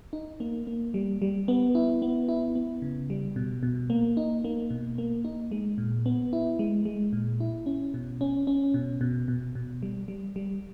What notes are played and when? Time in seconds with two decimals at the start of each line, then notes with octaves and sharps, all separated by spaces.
0.13 D#4
0.40 A#3
0.67 A#3
0.94 G3
1.22 G3
1.48 B3
1.75 E4
2.02 B3
2.28 E4
2.55 B3
2.82 C#3
3.10 G3
3.36 B2
3.63 B2
3.90 A#3
4.17 D#4
4.44 A#3
4.70 B2
4.98 A#3
5.25 D#4
5.51 G#3
5.78 A#2
6.06 B3
6.33 E4
6.59 G#3
6.85 G#3
7.13 A#2
7.40 E4
7.66 C#4
7.94 B2
8.21 C#4
8.47 C#4
8.74 B2
9.01 B2
9.28 B2
9.55 B2
9.82 G3
10.08 G3
10.36 G3